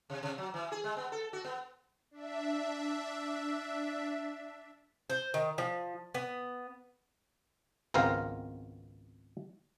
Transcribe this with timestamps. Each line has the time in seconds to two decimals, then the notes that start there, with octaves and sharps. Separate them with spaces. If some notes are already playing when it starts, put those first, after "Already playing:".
0.10 C3
0.23 C3
0.38 F#3
0.54 E3
0.72 G#4
0.84 G#3
0.97 B3
1.12 A4
1.33 F#4
1.44 B3
2.11 D4 E5
5.10 C5
5.34 D#3
5.58 F3
6.14 B3
7.94 G#1 C#2 B3 C4 A#4 F5